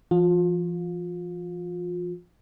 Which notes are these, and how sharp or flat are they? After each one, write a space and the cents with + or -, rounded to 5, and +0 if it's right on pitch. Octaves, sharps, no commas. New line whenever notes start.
F3 -40 F4 +30